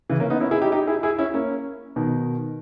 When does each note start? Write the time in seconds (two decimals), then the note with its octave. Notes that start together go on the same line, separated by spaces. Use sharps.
0.10 C#3 E3
0.20 A#3 C#4
0.30 B3 D#4
0.40 C#4 E4
0.51 E4 G#4
0.62 D#4 G4
0.72 D#4 G4
0.87 E4 G#4
1.03 E4 G#4
1.18 C#4 E4
1.34 A#3 C#4
1.96 B2 D#3